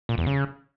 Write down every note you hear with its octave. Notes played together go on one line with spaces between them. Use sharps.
A#2
E2
C#3